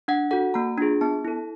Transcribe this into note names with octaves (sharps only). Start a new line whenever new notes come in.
D4 F#5
F#4 A4 F#5
A#3 A#5
D4 F4 G#4
B3 A5
E4 A4